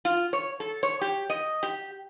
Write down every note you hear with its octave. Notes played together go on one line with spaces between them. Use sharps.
F4
C#5
A4
C#5
G4
D#5
G4